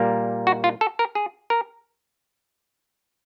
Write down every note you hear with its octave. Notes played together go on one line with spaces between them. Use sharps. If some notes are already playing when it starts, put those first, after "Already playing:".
Already playing: A#2 G3 A#3
F#4
F4
A4
A#4
G#4
A#4